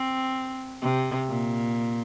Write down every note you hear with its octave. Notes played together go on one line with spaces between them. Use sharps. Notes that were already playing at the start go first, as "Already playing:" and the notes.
Already playing: C4
C3
A#2